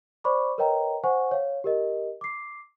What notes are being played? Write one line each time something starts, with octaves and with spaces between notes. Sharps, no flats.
C5 D5 B5 C#6 D6
A#4 B4 C#5 D#5 G5 A#5
C5 F#5 G#5 C#6
C#5 F5
G4 A#4 D#5
D6 C7